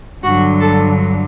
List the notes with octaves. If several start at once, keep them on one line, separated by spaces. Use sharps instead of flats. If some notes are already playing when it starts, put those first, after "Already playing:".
G2 D3 F#3 F#4
A4